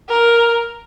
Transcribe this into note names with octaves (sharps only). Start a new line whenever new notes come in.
A#4